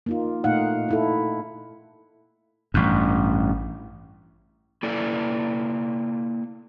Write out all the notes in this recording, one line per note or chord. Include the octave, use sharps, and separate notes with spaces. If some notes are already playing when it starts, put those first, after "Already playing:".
A#3 D#4 F4
A#2 A3 A#3 D#4 F5 F#5
D#4 E4 A4
A1 G2
A#3 E4 A4 D5